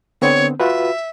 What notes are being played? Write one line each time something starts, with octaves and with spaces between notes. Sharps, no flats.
D3 B3 C4 C#5
F4 F#4 B4 E5